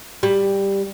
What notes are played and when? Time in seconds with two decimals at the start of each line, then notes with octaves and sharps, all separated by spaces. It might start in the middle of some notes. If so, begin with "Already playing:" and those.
0.23 G3